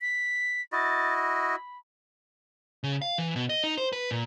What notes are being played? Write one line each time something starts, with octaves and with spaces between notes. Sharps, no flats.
B6
E4 F#4 D#5 A6
B5
C#3
F5
E3
B2
D#5
D#4
C5
B4
A#2